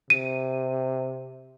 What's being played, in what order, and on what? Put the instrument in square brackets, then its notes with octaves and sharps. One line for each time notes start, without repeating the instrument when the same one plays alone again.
[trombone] C3 [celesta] D#7